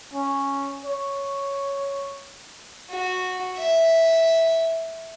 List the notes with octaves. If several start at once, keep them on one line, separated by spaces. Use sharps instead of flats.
C#4
C#5
F#4
E5